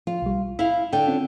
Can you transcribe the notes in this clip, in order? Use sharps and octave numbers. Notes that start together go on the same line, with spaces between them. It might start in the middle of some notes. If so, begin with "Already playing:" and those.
F3 F4
B1 G3
E4 F5 B5
D3 G5
C4 C#4 F4